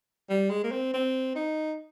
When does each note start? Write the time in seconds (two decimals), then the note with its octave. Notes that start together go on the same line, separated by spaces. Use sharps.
0.29 G3
0.50 G#3
0.63 A#3
0.71 C4
0.94 C4
1.36 D#4